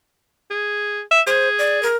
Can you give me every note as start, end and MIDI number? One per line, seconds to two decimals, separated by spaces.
0.51 1.01 68
1.11 1.21 76
1.27 1.88 68
1.27 1.49 72
1.59 1.82 74
1.83 1.96 70